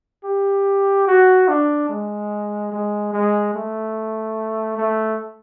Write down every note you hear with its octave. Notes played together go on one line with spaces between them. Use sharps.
G4
F#4
D4
G#3
G#3
G#3
A3
A3